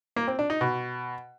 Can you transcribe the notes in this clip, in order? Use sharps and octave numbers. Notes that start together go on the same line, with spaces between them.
A#3
C4
D4
D#4
B2